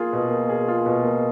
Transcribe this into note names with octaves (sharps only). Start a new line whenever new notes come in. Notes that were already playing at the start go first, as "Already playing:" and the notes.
Already playing: A#3 F4 G#4
B2
A#3
G#4
F4
B2
A#3